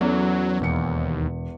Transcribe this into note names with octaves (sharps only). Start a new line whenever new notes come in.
E2 F#3 C#4 A4
E1 D#2 C#7